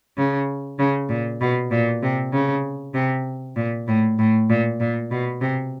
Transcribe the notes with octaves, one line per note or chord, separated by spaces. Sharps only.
C#3
C#3
A#2
B2
A#2
C3
C#3
C3
A#2
A2
A2
A#2
A#2
B2
C3